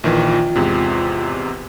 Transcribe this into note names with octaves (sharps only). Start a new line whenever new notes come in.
A#1 D#3 E3 F4 G5
E2 G#2 C3